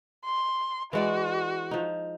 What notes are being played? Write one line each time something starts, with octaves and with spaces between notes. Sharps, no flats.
C6
E3 G#3 F#4 D5
F3 D#4